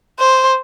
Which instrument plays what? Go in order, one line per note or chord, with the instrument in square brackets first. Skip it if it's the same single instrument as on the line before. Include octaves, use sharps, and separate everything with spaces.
[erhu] C5